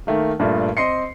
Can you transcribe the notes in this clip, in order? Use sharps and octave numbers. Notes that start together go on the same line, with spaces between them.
D#3 A3 A#3
G2 A#2 A3
C4 D#5 C6 C7 C#7